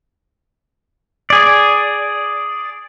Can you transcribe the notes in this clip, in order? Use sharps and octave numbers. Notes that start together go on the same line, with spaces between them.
G#4 D5